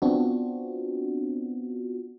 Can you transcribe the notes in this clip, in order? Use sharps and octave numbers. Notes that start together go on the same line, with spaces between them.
B3 C4 D4 F4 F#4